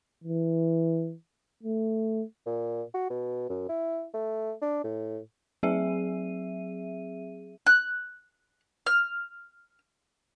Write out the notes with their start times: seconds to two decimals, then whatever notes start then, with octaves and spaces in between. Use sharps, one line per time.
0.24 E3
1.63 A3
2.46 A#2
2.94 F#4
3.10 B2
3.49 F#2
3.69 E4
4.14 A3
4.62 D4
4.84 A2
5.63 F#3 C4 G#4 E5 D#7
7.66 F#6
8.86 F6